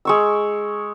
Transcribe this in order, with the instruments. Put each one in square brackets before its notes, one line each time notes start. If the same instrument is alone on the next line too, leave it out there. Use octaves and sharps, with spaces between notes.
[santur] G#3 C#6 E6